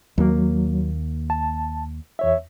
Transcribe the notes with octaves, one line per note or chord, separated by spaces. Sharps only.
D#2 F#3 A#3
A5
E2 C#5 E5